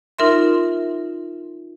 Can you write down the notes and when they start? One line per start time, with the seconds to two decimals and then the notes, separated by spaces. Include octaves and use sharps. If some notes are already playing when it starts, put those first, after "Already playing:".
0.19 D#4 F4 A#4 E5 C6